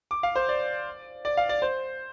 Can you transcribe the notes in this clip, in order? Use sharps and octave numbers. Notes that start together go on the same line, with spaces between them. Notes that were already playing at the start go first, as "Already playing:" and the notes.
D6
F5
C5
D5
D5
F5
D5
C5